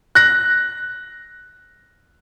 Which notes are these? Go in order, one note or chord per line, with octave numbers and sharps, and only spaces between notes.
F#6 A#6